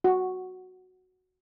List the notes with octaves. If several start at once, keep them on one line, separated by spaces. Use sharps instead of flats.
F#4